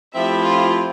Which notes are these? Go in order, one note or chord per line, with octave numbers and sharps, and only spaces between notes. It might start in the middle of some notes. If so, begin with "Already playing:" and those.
F3 A3 C4 E4 G4 E5
F4